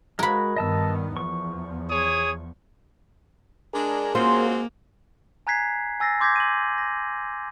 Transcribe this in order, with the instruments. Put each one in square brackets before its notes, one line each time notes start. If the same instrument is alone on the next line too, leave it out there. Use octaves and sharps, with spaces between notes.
[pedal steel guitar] G#3 F#4 [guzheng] A#4 B5
[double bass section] G2 D#3 B3 [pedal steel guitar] D#5 A5 E6
[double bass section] E2 F3 [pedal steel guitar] C#6
[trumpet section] G#4 C#5 D#6
[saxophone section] G#3 D4 [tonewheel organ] G#4 A#4
[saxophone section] G#3 C4 F#4 [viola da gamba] A#3 [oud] C#4 F4 C5
[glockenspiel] G#5 A#5 F#6 G#6 B6 C7
G#5 E6 A6 A#6 C7
C6 D6 G6 G#6 A#6 B6
D#7 F#7
A#6